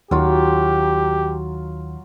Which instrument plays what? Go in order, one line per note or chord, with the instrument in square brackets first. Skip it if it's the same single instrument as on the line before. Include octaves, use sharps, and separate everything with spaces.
[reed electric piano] D#2 D#3 [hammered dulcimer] F#3 F4 [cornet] G4